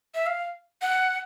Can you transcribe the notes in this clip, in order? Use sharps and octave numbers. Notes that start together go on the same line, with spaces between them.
E5
F5
F#5